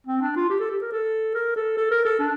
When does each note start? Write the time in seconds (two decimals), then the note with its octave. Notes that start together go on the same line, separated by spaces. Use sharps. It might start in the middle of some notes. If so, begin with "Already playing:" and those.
0.07 C4
0.21 D4
0.36 F4
0.50 G4
0.60 A4
0.70 G4
0.81 A#4
0.92 A4
1.34 A#4
1.56 A4
1.77 A4
1.91 A#4
2.05 A4
2.19 D4